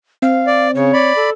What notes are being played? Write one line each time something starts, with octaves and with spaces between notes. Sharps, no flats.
C4 F5
D5
C#3 C#5
D5 B5
A4